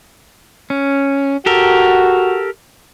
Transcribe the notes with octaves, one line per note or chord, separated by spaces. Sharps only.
C#4
F#4 G4 A4 A#4